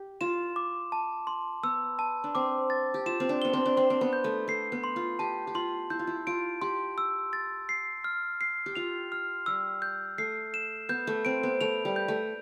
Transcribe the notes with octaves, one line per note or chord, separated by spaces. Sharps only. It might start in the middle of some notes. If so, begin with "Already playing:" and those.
Already playing: G4
F4 E7
D6
A5
C6
B3 E6
A5
D4
C4 D6
A6
G4
F4 E7
C4
D4
B3 G7
C4
D4
C4 C6
C4
B3
G6
A3
A3 C7
B3
C6
F4
G4 A5
G4
F4 C6
E4 G6
F4
E4
F4 D7
G4 C6
E6
A6
C7
F6
C7
G4
F4 F7
F6
G3 E6
G6
A3 C7
E7
B3 G6
A3
C4 D7
B3
A3 F7
G3
G6
A3